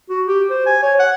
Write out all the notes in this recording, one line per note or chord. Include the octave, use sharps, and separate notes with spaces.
F#4
G4
C5
G#5
C#5
F#5